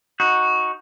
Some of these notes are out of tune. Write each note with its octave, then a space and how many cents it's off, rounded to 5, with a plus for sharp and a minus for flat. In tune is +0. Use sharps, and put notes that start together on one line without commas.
D#4 +15 F#4 -5